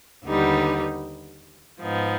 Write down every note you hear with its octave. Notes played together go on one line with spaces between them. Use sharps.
D#2 D3 G3 B3 D#4
G#2 F3 B3 D#4